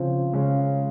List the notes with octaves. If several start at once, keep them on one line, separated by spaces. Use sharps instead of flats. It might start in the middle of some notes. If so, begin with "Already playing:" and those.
Already playing: C#3 F3 C4
C#3 G#3 C#4